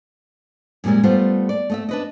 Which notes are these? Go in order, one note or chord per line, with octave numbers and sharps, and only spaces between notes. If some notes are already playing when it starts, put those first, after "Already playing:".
F#2 A#2 E3 G3 G#3
G3 A3 B3 F4 C5
D5
A3 D#5 E5
D4 B4 D#5